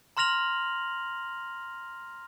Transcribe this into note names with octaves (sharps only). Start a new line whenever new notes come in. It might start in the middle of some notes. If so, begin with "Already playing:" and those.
A#5 C6 F6 A#6 F7 F#7